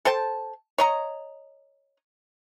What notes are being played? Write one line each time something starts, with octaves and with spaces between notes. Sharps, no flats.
A4 C5 G5 A5
C#5 D#5 A#5